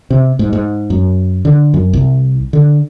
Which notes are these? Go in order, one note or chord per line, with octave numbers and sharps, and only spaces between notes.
C3
G#2
G#2
F#2
D3
F#2
C2
D3